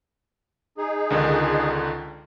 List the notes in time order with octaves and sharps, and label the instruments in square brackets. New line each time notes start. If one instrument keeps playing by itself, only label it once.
[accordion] D#4 G#4
[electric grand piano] C#2 D3 D#3